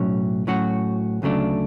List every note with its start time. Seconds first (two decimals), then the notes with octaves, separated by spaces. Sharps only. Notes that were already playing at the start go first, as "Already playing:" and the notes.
Already playing: B1 A2 F#3 C#4
0.47 A2 F#3 C#4 F#4
1.22 D2 C#3 F#3 A3 D4